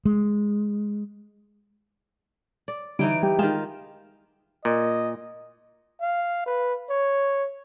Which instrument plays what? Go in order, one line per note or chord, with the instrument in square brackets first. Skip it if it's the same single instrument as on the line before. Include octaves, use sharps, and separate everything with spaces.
[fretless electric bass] G#3
[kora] D5
[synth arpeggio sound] D3 G3 [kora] E3 D#4 E4 [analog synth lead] D7
[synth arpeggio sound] G3 [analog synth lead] G4
[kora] D#3 F4 [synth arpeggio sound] G#3 G#4 E7
[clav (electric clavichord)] A#2 [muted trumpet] D#5
[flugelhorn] F5
B4
C#5